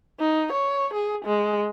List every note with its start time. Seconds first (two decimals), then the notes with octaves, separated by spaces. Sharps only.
0.20 D#4
0.53 C#5
0.94 G#4
1.25 G#3